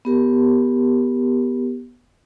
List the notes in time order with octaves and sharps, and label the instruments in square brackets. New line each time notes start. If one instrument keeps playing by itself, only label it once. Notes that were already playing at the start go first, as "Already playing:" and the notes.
[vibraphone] B3 G4 A#4